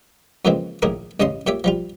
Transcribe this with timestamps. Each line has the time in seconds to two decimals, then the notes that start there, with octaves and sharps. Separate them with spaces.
0.45 F2 A#2 C#3 E3 G#3 C4
0.82 A#1 A2 D#3 G#4 A#4 D6
1.20 A1 G2 C#3 C#4 D#5 C6
1.47 A#2 G4 C#5 E5 D6
1.64 F3 G3 F4